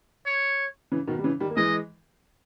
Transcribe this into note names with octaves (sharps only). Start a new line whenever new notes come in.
C#5
C#3 E3
B2 D#3
G3
C#3 E3
D#3 G3
A#3
E3 G#3 D#5